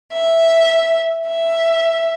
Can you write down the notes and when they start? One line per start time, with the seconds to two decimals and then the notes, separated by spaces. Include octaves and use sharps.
0.12 E5
1.26 E5